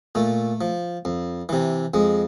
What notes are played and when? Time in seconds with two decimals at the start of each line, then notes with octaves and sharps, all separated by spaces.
0.15 A#2 A3
0.61 F3
1.05 F2
1.49 C3 E3
1.94 F2 G#3